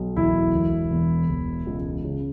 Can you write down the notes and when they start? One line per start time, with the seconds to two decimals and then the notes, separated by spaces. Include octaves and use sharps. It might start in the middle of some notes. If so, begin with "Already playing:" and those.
Already playing: B1
0.16 E1 E4
0.54 E1
0.91 E2
1.29 E1
1.66 C#2
2.04 C#3